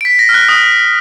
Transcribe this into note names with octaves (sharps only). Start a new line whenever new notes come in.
D7
B6
A#6
F6
F#6
D#6